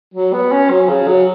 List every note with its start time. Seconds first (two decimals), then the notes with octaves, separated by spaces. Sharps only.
0.14 F#3
0.33 B3
0.52 C#4
0.70 F#3
0.89 C#3
1.07 F#3